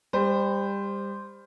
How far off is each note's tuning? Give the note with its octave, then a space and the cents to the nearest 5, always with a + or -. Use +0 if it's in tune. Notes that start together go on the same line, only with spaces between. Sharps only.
G3 +25 C5 -5